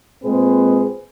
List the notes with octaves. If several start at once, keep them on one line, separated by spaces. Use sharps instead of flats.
A#2 G#3 C4 G#4 B4 C5